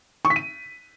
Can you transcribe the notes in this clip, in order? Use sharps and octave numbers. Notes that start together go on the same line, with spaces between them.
C#6
B6
D#7